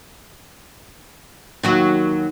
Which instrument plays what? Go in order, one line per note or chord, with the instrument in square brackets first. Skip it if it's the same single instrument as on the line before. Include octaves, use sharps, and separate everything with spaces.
[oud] D#2 F#3 F#4